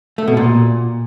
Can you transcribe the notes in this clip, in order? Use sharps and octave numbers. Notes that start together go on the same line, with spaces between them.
A3
B2
A#2